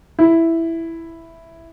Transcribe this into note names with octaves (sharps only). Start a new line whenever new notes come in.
E4